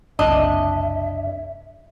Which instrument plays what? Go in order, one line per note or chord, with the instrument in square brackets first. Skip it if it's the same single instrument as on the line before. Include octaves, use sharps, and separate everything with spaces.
[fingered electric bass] F#1 C2 [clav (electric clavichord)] D4 [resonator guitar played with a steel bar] D#5 [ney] E5